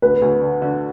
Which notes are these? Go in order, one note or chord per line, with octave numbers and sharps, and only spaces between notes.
D2 B4
D2
D3
D3